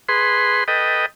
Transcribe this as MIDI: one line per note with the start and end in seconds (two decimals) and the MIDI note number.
0.09 0.64 68
0.09 0.64 71
0.09 0.64 84
0.68 1.06 69
0.68 1.06 71
0.68 1.06 75
0.68 1.06 79